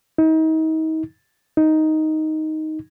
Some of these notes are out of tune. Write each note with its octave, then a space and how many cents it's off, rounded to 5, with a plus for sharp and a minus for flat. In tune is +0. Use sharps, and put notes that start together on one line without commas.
D#4 +35
D#4 +5